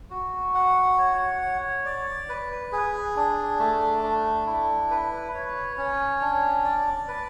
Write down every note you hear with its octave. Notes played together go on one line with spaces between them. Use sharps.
F#4
F#5
C#5
C#5
D5
B4
G#4
D4
A3
D4
E4
B4
C#5
C#4
D4
D5
B4